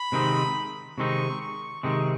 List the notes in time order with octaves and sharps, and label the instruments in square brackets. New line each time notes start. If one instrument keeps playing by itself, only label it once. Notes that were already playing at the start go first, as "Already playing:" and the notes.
Already playing: [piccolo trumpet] B5
[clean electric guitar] C3 D#3 G#3 C4 D#4
[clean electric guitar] C3 D#3 G#3 C4 D#4 [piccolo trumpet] C#6
[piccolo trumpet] C#6
[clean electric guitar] C3 D#3 G#3 C4 D#4 [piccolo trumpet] C#6